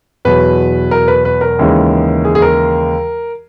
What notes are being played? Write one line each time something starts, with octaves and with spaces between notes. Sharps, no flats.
E2 B2 F#3 B4
A#4
B4
B4
A#4
D#2 C#3 E3 G#3
G#4
G#4
A#4